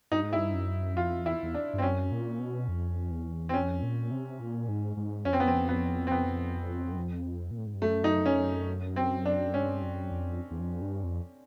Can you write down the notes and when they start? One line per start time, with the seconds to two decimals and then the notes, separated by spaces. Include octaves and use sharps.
0.11 G2 D#4
0.23 G#2
0.33 E4
0.36 G2
0.54 F#2
0.97 F2 F4
1.25 E2 E4
1.43 E2
1.54 D4
1.73 G2
1.78 C4
1.82 F#2 C#4
2.12 A#2
2.39 B2
2.68 F2
3.11 E2
3.49 C4
3.54 F2 C#4
3.83 A#2
4.11 C3
4.39 A#2
4.68 G#2
4.97 G#2
5.25 F2 C#4
5.33 C4
5.40 B3
5.47 C4
5.69 B3
6.07 C4
6.11 B3
6.92 F#2
6.97 F2
7.51 A#2
7.58 A2
7.66 G#2
7.75 G2
7.82 F#2 A3
8.04 D#4
8.26 C#4
8.96 C4
9.25 D4
9.53 G2 C#4
9.82 F#2
10.11 F2
10.51 E2
10.60 F2
10.82 G2
11.04 F2